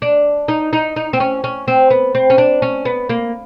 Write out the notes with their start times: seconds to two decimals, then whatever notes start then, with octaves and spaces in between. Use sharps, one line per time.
0.02 D4
0.48 D#4
0.73 D#4
0.96 D#4
1.13 C4
1.20 C#4
1.44 C#4
1.68 C4
1.90 B3
2.15 C4
2.30 C#4
2.38 D4
2.62 C#4
2.85 B3
3.09 A#3